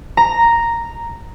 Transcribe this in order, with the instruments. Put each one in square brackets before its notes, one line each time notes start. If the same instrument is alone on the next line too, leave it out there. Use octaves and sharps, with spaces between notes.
[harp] A#5